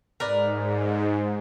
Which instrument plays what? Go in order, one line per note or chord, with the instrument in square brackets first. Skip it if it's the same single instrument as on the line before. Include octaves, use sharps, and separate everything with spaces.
[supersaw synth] G#2 [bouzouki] A#4 B4 D5